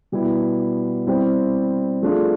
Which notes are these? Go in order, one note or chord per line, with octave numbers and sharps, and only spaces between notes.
B2 G3 B3 E4
G3 C4 E4
F3 A3 D4 F4 G#4